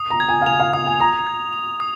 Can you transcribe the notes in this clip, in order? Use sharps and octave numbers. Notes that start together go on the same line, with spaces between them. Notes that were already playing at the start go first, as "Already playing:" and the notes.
Already playing: D#6
A#5
G#6
G#5
F5
G#5 F7
F5
F5 D#6
G#5
A#5 D#6
G#6
F7
D#6